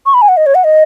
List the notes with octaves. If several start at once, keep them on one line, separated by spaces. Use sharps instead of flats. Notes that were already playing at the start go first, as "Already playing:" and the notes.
C#6
B5
G#5
F#5
D#5
C#5
F#5
D#5